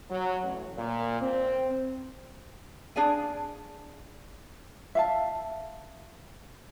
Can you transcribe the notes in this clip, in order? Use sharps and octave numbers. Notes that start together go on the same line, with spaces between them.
F#3
A1
A#2
C4
D4 G#4 D5 F5 G#5
E5 F5 A5